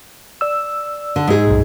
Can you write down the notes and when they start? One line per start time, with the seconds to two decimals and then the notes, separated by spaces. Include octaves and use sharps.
0.41 D5 E6
1.16 D3
1.27 G#2 G#4
1.47 B1 F#2 A#2